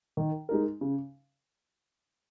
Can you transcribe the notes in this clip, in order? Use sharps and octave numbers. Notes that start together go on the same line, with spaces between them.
D#3
G#3 D#4 A#4
C#3